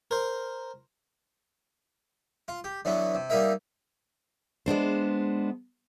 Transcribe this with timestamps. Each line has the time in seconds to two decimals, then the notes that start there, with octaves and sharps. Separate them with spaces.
0.11 A#4 C5
2.48 F4
2.64 G4
2.85 D3 E3 F#3 B3
3.15 C3
3.30 G3 A#3 D#4 A#4 E5
4.66 G#3 B3 D4 C5